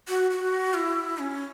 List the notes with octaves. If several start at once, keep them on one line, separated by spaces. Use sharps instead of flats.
F#4
F#4
E4
C#4